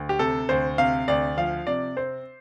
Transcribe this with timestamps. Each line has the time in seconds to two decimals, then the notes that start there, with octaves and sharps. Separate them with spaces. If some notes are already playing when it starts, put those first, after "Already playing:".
Already playing: D2
0.09 G4
0.19 C3 A4
0.49 D2 C5
0.78 C3 F5
1.08 D2 D5
1.37 F3 F5
1.67 C3 D5
1.96 C4 C5